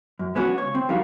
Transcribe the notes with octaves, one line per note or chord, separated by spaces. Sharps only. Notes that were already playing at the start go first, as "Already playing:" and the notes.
F#2
G#3 B3 C#4 D4 F#4
C#2 C#5
C4
F3 G3 D#4 F#4 A#4 F5